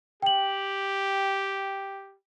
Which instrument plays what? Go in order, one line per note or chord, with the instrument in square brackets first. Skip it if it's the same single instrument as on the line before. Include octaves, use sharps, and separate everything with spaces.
[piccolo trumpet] G4 [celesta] G5 F#7